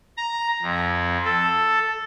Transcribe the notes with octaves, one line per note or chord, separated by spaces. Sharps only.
A#5
F2
A4